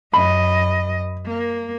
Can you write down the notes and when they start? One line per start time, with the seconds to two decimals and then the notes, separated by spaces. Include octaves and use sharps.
0.13 F#2 D#5 B5
1.26 A#3